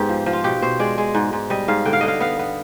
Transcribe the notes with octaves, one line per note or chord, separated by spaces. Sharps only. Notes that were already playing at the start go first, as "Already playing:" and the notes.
Already playing: G#2 B3 G4
F3
F3
F4
B2 G4
B2 C5
G#3 D5
G#3
G#2
G#2
G3 D#5
G#2 F5
D3 G5
F5
D3 D#5
F5
B3 F5
B3